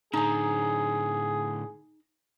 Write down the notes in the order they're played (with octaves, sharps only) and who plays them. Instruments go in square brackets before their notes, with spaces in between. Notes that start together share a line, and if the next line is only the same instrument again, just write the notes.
[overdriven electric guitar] A2 D3 [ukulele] D#4 A#5 [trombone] G#4